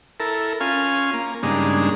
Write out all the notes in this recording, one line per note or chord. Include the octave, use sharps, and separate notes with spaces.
E4 A4 A#4
C#4 F4 F5 G#5
A#3
G2 C#3 G#3 A#3 D4 D#4